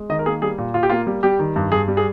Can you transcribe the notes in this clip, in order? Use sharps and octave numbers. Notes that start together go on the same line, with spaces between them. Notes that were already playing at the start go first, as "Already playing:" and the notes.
Already playing: G#3
D#3 D#5
A#4
A#3 G#4
G3 G#4
A#2
A#2 F4
G4
A#3 F4
G3
G3 G4
D#3
G2
G2 G#4
G3
G#4